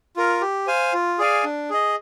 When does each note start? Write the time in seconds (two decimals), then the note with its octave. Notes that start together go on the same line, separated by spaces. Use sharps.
0.16 F4 A#4
0.41 G4
0.67 C5 F5 G#5
0.93 F4
1.18 G#4 D5 F5 G#5
1.44 D4
1.70 G#4 D#5